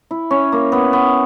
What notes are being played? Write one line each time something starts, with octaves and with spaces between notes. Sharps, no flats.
E4
C#4
A#3
B3
B3